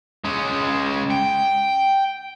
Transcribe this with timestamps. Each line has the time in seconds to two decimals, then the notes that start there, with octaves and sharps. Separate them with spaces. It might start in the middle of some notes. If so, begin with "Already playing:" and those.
0.24 G#3 C#4
1.10 G5